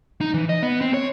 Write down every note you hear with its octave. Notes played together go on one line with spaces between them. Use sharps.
D#4
E3
D#5
B3
C4
C#5